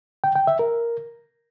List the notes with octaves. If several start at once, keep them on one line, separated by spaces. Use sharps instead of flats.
G5
G5
E5
A#4